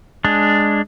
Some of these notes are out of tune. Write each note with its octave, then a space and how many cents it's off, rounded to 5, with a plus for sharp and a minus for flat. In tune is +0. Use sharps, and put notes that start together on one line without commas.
G#3 +0 D4 +0